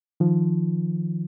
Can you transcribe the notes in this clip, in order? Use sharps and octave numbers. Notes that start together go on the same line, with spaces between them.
D#3 F3